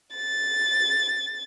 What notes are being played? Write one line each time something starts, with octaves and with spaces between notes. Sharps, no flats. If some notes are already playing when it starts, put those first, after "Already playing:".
A6